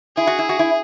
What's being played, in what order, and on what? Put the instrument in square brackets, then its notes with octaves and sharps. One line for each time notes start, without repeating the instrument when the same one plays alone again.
[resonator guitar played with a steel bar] E4 [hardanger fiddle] G#4
[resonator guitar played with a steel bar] F#4
E4
F#4
E4